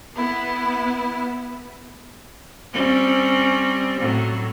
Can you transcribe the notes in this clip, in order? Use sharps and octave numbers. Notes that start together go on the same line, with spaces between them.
B3 E4
G3 C4 C#4
A2 F#3